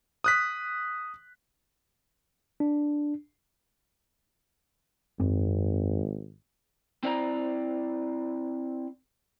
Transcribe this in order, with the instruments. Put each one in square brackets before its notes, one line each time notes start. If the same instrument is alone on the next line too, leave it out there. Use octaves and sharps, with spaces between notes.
[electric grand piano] D#6 F#6 B6
[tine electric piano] D4
[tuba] G#1 [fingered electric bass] F#2 C4
[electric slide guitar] C4 E4 D5 G#5 A#5